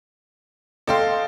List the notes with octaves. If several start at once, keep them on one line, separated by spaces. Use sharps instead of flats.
A4 D#5 F5 G5 C6